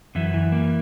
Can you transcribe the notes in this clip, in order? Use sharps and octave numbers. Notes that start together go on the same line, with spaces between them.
F#2 E3 E4
E3
A#3